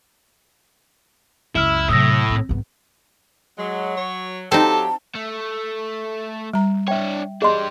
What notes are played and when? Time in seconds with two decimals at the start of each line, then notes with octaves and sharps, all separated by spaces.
1.55 C#2 F#2 E4 E6 F6 E7
1.89 A2 C3 F#3 D#6 E6 A#6
2.29 D#3 C4
2.49 G#1 B3
3.58 F#3 G#3
3.97 C#5
4.52 F#3 C4 D#4 F4 G4 A4 A5
5.15 A3
6.53 G3 A#5
6.88 D4 C#5 E5 G5
7.42 D4 G4 G#4 D#5 C6